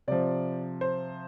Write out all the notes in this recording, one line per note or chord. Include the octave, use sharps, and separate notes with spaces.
C3 F3 D5
C5